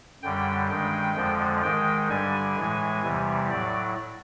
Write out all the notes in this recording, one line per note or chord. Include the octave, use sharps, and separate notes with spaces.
F#2 D3 G3 G5
G2 D#3 G#3 G5
F2 D3 F3 G#3
G#2 D#3 G#3 G5
G2 D3 G3 G#5
A2 E3 G#3
E2 C3 E3 G3
A2 F#3 D5